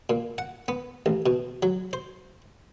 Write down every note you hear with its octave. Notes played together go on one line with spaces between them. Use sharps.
A#2
F#5
B3
A1
B2
F#3
C5